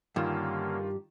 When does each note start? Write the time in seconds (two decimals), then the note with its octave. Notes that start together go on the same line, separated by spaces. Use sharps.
0.16 G2 D3 D#3 A#3 C#4 F4 G4 E7